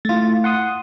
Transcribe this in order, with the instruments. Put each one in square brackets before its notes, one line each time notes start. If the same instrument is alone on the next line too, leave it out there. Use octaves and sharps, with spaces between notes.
[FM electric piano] A3 E4 [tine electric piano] F4 A6
[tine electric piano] F#5 C6 D#6